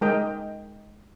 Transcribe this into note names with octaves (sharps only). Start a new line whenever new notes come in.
G#3 D#4 A#4 D#5 G5